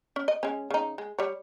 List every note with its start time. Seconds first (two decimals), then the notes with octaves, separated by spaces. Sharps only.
0.16 C#4
0.28 D#5
0.43 G#3 C#4
0.70 C#3 D#4
0.98 G#3
1.19 G3 C#5